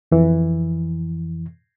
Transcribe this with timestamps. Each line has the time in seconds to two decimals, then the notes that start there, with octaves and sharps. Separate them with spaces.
0.12 F2 E3